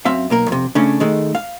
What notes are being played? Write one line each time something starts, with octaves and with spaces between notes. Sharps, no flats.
F#2 C4 E5 F5
B1 A#3 A#4
F2 C3
C#3 A3 C#4 D4
D#3 G#3 A3
F5